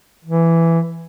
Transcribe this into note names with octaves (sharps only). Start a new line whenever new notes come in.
E3